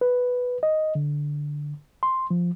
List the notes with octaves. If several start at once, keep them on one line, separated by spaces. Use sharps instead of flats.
B4
D#5
D3
C6
F3